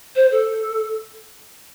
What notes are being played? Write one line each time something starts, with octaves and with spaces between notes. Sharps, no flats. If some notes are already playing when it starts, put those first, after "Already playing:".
C5
A4